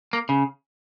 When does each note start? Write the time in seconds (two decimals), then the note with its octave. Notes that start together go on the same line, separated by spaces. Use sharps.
0.13 A#3
0.29 C#3